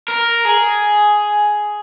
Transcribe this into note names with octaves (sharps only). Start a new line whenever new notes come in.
A#4
G#4